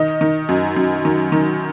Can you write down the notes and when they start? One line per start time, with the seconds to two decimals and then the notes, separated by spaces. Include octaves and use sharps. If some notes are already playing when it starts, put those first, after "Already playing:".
Already playing: D#3 D#5
0.21 D#3
0.49 F#2
0.76 F#2
1.05 D#3
1.32 D#3